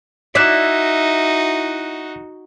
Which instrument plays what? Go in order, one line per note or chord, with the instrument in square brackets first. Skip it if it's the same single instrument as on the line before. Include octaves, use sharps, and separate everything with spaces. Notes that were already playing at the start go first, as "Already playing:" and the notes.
[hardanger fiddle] D#4 F#4 [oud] E4 D5 [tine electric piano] F#6 B6